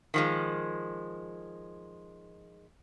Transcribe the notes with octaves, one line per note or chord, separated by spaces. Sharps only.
D#3 F3 G#3